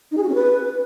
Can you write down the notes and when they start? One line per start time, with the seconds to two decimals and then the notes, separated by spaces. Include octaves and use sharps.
0.11 D#4
0.17 G#4
0.23 F#4
0.29 C#4
0.35 B4